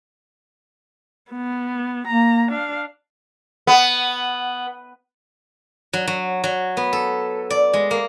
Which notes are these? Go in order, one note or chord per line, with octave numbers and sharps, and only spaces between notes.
B3
A#3 A#5
D4 F5
B3
F#3
F#3
F#3
B3
A4
D5
G#3
A#3